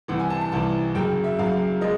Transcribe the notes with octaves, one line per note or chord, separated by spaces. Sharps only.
C2 C3 E3 F#5
G#5
A5
A5
C2 C3 E3 A5
F#2 C#3 F#3 G5
E5
F#2 C#3 F#3 F5
C#3 F3 G#3 D#5